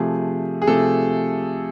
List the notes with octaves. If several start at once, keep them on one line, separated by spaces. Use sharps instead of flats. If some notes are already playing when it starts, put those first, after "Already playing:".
Already playing: C3 F3 A3 G#4
G#4
C3 F3 A3 A4